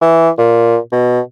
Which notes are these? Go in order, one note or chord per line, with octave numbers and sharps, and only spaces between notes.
E3
A#2
B2